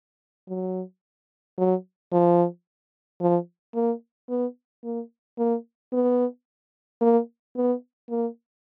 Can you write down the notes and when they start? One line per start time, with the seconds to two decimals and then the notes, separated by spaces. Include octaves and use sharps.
0.49 F#3
1.58 F#3
2.12 F3
3.21 F3
3.75 A#3
4.29 B3
4.83 A#3
5.38 A#3
5.93 B3
7.01 A#3
7.56 B3
8.10 A#3